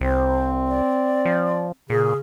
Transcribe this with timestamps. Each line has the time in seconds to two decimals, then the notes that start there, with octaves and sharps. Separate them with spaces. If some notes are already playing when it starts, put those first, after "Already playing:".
0.01 C2 C4 C5
0.68 D5
1.25 F3
1.90 A#2 C#3 G#4